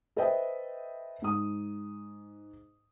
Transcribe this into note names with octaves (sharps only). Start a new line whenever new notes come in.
A4 B4 C5 D#5 E5 G5
G#2 D#6